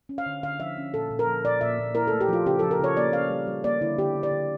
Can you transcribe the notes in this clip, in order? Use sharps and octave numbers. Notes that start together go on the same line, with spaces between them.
C#4
F5
D3
D3 F5
F3 E5
C#4
A#2 A4
A#2
A#4
F3
A#2 D5
A#2 E5
A#2
E4 A#4
A4
A3
G4
F3 F4
C#3 G4
A4
F3
A#4
C#3 C#5
A#3 D5
C#4 F5
G3
G3
A#3 D5
D3 E4
D3 G4
D3
D5
D3